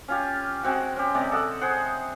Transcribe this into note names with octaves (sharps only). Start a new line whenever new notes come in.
C#4 F4 G4
G#3 C4 F#4
C#4 G4
C3 G#3 D5
A4 D#5 F#5
G#4 C5 F#5